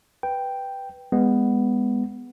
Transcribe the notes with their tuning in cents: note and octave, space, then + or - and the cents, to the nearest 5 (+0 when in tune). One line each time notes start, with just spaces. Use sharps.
B4 +0 G5 +0
G#3 -20 B3 +0